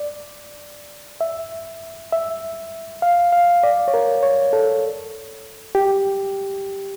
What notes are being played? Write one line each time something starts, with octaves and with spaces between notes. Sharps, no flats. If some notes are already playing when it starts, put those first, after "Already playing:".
Already playing: D5
E5
E5
F5
F5
D5
C#5
A#4
C#5
A4
G4